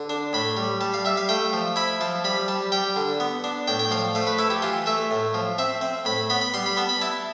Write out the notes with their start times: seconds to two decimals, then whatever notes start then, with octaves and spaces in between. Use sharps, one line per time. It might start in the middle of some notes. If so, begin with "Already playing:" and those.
Already playing: D3
0.10 D4
0.33 A2 B5
0.57 G3
0.81 G3 A5
0.94 F5
1.05 G3 E5
1.17 F5
1.29 A3 G5
1.53 F3
1.76 E4 B5
2.01 F3 A5
2.24 G3 B5
2.48 G3 A5
2.72 G3 G5
2.96 D3
3.20 B3
3.44 D4
3.67 A2 G5
3.79 G5
3.91 F3 F5
4.15 A3 F5
4.27 B4
4.38 E4 A4
4.50 G4
4.62 E3 F4
4.86 A3 E5
5.11 A2
5.34 F3
5.58 C4 E5
5.81 C4
6.05 A2 B5
6.30 B3 B5
6.41 B5
6.54 G3 C6
6.66 B5
6.77 B3 A5
6.89 B5
7.02 E4 A5